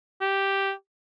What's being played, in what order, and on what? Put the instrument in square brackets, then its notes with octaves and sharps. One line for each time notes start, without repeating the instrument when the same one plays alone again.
[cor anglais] G4